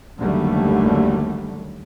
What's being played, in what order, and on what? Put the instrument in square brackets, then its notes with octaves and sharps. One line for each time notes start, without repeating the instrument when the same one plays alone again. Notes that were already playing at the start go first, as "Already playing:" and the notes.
[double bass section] F#1 D#2 D3 F#3 G3 A3